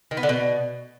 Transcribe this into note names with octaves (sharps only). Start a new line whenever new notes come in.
D#3
B3
D3
B2